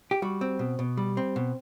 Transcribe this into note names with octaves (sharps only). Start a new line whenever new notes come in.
G4
G3 F#4
C4
B2
B2
G3
C4
B2